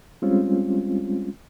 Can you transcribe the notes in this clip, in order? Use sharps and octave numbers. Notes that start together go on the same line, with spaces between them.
G3 G#3 C4 C#4 F4